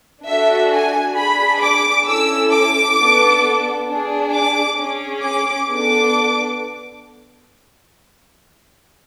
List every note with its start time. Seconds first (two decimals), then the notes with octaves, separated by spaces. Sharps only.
0.25 D4 F#4 A4 E5
0.71 G#5
1.16 D4 G#4 B5
1.62 D6
2.06 C#4 E4 A4 E6
2.51 D6
2.97 B3 D4 A4
3.88 D4 G#4
4.33 D6
4.79 C#4 G#4
5.23 D6
5.69 B3 D4 A4 D6